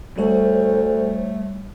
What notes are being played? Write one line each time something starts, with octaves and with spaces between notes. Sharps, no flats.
D2 G3 A3 C5 C#5